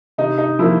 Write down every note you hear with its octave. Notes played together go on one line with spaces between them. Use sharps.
C3 D#4
D#4
F3 A#3 E4